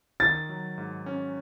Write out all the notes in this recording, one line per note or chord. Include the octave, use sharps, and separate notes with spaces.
D#3 A6
F#3
G#2
C#4